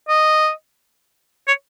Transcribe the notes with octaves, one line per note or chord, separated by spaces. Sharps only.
D#5
C#5